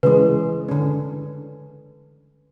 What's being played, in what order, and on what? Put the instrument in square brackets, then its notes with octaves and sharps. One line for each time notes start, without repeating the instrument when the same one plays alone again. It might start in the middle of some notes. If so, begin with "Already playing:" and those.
[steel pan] C#3 E3 G#3 [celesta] B4
[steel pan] D3 C#4